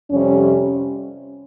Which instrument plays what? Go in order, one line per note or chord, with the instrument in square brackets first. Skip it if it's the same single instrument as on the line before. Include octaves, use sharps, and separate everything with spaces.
[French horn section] F2 C3 G3 C#4